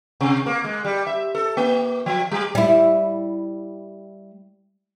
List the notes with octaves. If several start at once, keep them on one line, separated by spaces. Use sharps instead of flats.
C3
A#3
G#3
G3
E5
A4
A#3
F3
G3
G3 E4